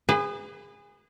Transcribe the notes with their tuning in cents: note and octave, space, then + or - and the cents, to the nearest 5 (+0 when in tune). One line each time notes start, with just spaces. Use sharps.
G#4 -25 B4 +30